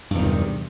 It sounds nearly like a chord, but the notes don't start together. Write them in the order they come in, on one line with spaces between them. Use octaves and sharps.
G2 E2 D#3 C3